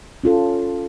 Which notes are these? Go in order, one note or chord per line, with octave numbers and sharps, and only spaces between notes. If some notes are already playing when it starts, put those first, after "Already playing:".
C#4 F4 A4